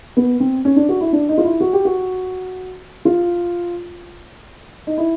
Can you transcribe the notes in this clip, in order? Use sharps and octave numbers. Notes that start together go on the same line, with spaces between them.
B3
C4
C#4
D4
F#4
E4
D4
D#4
F4
E4
F#4
G4
F#4
F4
D#4
E4